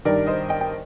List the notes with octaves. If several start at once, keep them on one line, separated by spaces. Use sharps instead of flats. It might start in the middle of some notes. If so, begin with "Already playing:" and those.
G2 D#3 G3 A#4 D5
C5 D#5
D#5 G5
G5